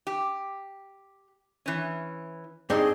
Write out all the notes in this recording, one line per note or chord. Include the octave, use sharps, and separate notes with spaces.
G4
E3 C#4
G2 C4 D4 D#4 G#4